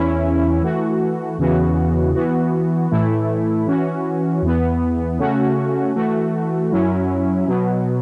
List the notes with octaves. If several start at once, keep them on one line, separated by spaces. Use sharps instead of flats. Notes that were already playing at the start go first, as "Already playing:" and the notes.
Already playing: E2 E3 C#4 E4
E3 A3 F#4
E2 C#3 E3 B3 F#4
E3 B3 F#4
A2 E3 A3 E4
E3 C#4 F#4
E2 E3 B3
C#3 A3 C#4 F#4
E3 A3 F#4
F#2 F#3 C#4 E4
B2 F#3 B3